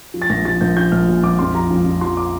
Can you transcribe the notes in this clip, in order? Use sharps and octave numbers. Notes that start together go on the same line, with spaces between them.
F3
A6
A#1 A#6
F3 A6
A#1 G6
F3 G6
A#1 F6
A#2
A#1 D6
F2 C6
F3 A#5
F2
F2
F3 C6
D6